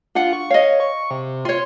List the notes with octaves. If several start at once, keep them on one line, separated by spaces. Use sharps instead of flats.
D4 F4 F#5
C#6
C#5 D#5 F5
C#6
C3
F4 C#5 C6